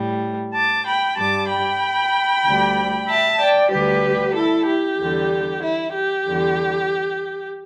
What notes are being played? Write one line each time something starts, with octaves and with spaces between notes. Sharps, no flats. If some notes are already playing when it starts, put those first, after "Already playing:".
Already playing: A2 G3
A5 D6
G5 B5
G2 G3 A5 D6
G5 B5
D2 D3 G3
E5 A5
D5 G5
D2 D3 G3 G4 B4
E4 A4
G4
E2 D3 G3
E4
G4
E2 D3 G3